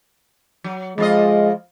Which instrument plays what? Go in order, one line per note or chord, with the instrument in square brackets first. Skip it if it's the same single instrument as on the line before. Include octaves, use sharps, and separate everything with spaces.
[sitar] F#3
[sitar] F2 F4 D#5 [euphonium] G#3